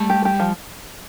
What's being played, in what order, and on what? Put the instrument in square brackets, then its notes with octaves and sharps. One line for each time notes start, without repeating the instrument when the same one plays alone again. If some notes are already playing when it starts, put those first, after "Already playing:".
Already playing: [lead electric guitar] G3 [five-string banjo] A3
[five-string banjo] G4
G4
F3